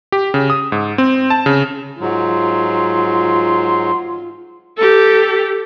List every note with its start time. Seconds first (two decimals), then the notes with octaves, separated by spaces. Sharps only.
0.12 G4
0.34 C#3
0.50 D#6
0.72 G#2
0.98 C4
1.30 A5
1.46 C#3
2.01 G#2 F#3 F4 C6
4.77 G4 A4